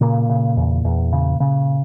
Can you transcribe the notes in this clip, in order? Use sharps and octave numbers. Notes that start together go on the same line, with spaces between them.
A#2 C#3 A#3
C#3
E2
E2
C#3
C#3